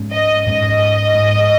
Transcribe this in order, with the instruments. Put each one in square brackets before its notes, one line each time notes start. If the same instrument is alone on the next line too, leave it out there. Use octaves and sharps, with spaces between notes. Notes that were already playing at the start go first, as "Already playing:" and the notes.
Already playing: [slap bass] G#2 G#3 C#4
[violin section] D#5
[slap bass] G#2 G#3 C#4 [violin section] D#5
[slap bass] G#2 G#3 C#4